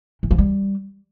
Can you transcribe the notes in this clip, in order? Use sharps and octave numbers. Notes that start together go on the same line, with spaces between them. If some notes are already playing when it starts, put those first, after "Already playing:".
E3
F3
G3